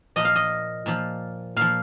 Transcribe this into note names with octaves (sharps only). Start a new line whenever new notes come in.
A#2 F3 D#5
F5
D#5
A#2 F3
A#2 F3 F5